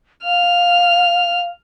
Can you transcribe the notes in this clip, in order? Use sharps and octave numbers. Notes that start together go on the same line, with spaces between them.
F5 F6